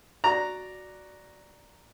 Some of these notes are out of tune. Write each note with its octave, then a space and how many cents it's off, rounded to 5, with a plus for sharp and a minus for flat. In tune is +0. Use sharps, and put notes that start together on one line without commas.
F#4 +0 D5 +0 A#5 +0